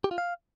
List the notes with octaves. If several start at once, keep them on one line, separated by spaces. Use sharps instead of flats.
G4
F4
F5